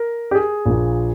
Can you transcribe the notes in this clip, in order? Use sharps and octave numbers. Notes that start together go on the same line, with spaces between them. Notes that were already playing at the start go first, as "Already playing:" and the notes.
Already playing: A#4
G4
G#4
A#1 A#2